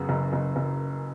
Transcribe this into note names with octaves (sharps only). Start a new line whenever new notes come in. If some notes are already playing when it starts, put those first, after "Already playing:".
Already playing: F#2 C#3 B3
F#1
F#1
F#1